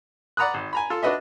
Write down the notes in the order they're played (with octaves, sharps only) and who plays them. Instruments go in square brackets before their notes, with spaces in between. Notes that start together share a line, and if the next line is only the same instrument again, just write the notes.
[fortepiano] D5 F#5 A#5 B5 D#6 F#6
G#1
G#5 A#5 B5
F4 A4
D4 F#4 B4 D#5 E5